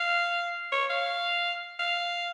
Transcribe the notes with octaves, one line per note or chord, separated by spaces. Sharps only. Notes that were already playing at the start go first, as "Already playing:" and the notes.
Already playing: F5
C#5
F5
F5